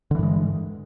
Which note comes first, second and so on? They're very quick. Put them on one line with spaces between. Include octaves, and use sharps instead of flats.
D3 E3 G2 G#3